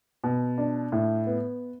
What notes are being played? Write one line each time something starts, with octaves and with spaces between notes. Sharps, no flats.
B2
D4
A2
B3